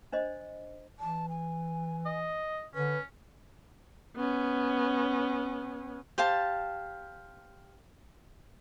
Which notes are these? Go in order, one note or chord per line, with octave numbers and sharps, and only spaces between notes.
D4 C5 D#5
E3 A5
G#5
D#5
D3 C#4 B4
B3 C#4
G4 C5 F5 A5